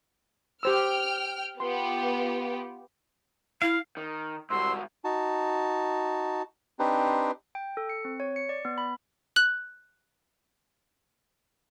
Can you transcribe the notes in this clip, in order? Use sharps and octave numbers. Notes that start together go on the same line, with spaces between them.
G4 C5 G5 E6 F6
B3 F4 G4 C6
E4 F5
D#3
C2 G#2 G3 F#4 C6 E6
D#4 F#4 A5
C4 D4 D#4 G4 B4 C5
G5
A4
C#7
C4
C#5
C#7
D5
B3
B5
F#6 F#7